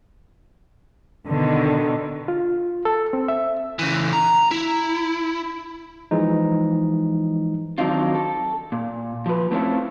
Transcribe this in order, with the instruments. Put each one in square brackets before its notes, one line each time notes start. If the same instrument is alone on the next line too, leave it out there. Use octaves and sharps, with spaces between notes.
[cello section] B2 D3 D#3
[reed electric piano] F4
A4
C4
E5
[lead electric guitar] C#3 E3
A#5
E4
[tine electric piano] E3 F3 G#3 D#4
[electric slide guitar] D#3 F#3 C4 D4 D#4 F4
A4
A#2
F3 B4
A3 C4 C#4 E4 F4 A4